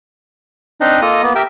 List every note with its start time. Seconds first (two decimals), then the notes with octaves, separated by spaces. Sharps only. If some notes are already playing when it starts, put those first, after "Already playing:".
0.81 C4 D4 D#4 D#5
1.02 A#3 F4 A4 D#5 A#5 D#6
1.22 A#3 B3
1.35 G4 A#4 E5 G5